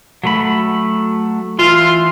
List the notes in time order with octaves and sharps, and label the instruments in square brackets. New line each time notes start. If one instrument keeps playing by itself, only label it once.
[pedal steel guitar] F#3 A3 B5
[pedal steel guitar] E3 [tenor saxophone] F4